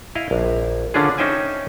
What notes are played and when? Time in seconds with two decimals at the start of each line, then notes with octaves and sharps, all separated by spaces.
0.15 E4 D#5 F5
0.31 A#1
0.94 D3 C#4 D4 F4 G#4
1.18 C#4 D#4 C5 E5 G5 G#5